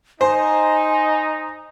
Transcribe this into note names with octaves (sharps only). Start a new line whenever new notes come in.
D#4 C5 G#5